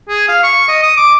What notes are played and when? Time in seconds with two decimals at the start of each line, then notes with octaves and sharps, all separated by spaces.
0.09 G#4
0.29 F5
0.43 C#6
0.68 D#5
0.83 D#6
0.97 D6